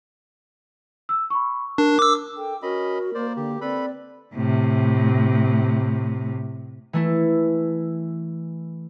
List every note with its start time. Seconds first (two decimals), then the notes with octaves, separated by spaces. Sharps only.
1.09 E6
1.30 B5 C#6
1.78 D4 A#4
1.99 D6 E6
2.37 A4 G5
2.62 C#4 F#4 A#4 D#5 B5
3.15 A#3 C5 D5
3.36 D3 G4
3.61 C4 A4 B4 D5 B5
4.34 A2 C3
6.93 E3 A3 E4